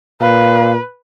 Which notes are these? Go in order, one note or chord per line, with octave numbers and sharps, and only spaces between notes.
A#2 B4 F5